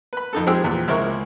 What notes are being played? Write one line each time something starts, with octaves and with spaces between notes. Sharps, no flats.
B4 B5
F2 D#4 A4
F3 G#3 C4 G4 G#4 E6
E2 A#2
C#2 G#3 C4 E4 A#4 C#6